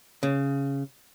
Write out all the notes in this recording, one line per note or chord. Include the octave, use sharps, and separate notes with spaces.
C#3